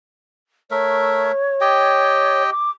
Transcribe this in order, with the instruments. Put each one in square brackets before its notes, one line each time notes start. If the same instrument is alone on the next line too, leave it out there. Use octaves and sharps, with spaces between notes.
[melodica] A3 A#4 E5 [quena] C#5
[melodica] G4 D#5 G5
[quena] D6